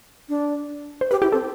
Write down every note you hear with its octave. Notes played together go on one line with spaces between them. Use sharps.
D4
C5
G4 B4
E4 G4
C4 A4